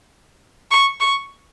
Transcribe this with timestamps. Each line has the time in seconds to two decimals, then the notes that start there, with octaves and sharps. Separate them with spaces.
0.71 C#6
1.00 C#6